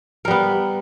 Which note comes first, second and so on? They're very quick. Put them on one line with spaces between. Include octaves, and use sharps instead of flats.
A#4 G3 B3